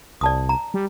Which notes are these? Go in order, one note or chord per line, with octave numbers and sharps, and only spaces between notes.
C2 D5 A5 D#6
A#5
G3